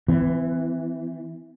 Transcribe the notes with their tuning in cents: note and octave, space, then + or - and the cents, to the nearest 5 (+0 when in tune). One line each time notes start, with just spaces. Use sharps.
E3 +0 C4 -45